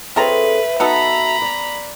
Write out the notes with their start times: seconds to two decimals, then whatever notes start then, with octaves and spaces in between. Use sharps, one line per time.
0.16 C4 F4 G#4 A4 B4 C#5 E5 A#5
0.80 B3 D#4 F#4 A4 A#5 B5
1.42 D5